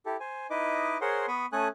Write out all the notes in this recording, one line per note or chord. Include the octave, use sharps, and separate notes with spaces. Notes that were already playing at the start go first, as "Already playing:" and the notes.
E4 G4 A4
C5 G#5
D#4 E4 B4 D#5 D6
G#4 A#4 C5 C#5 F#5 C6
B3 B5 C#6 D#6
A3 C#4 A4 G#5 D#6 F#6